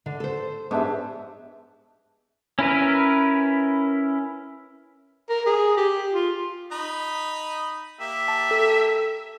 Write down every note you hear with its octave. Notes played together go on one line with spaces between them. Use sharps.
D3
A4 C5
G#2 B3 D4 E5
C#4 E4 A#4 B4
A#4
G#4
G4
F4
D#4 B5 D#6
A#3 G4 E5
A5
A4